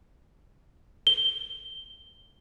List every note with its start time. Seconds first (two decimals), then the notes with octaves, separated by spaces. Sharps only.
1.07 G7